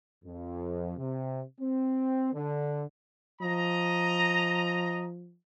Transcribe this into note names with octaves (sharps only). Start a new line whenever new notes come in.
F2
C3
C4
D3
F3 D#5 A#5